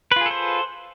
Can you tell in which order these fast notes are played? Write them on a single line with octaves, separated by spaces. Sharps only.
B4 F4 G#4 A4 C5